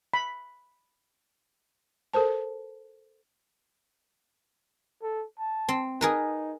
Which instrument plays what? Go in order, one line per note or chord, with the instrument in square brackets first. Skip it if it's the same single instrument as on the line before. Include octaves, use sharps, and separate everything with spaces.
[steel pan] B5
[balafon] A4 A#4 C5 A5
[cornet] A4
A5
[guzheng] C4
[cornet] D#4 [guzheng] G#4 A#4 B4